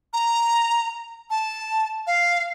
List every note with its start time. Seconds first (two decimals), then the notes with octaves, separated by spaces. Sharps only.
0.13 A#5
1.30 A5
2.07 F5